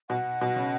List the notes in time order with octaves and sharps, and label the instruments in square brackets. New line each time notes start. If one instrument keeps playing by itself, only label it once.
[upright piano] B2 [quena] F#5
[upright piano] B2
C#3